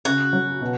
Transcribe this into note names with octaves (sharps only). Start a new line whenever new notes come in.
C#3 F#4
F#3
B2